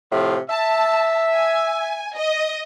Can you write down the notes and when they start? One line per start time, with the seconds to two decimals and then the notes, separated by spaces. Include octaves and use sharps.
0.11 A2 C3 F3
0.49 E5 A5
1.34 G#5
2.17 D#5